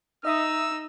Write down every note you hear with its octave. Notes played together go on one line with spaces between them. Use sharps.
D#4 D#5 E5 D#6 E6